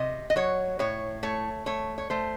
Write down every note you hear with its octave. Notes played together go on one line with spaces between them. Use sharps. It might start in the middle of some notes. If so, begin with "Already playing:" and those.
Already playing: C3 D#5
D#5
F#3 C#5
A2 C#5
A3 C#5
A3 C#5
C#5
A3 C5